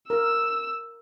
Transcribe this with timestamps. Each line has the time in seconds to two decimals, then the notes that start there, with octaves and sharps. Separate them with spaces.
0.10 A#4 E6